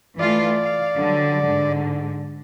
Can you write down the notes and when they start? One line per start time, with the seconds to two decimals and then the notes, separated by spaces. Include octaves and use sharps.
0.19 E3 A3 F4 D5
0.63 F5
0.98 D3 F#3 G3
1.44 G#2 D3